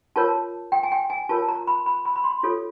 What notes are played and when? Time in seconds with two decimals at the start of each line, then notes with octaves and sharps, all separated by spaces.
0.16 F4 A#4 C#5 A5
0.72 G5
0.83 G#5
0.92 G5
1.10 G#5
1.29 F4 A#4 C#5 A5
1.48 A#5
1.67 B5
1.86 B5
2.05 B5
2.16 B5
2.24 C6
2.43 F4 A4 C#5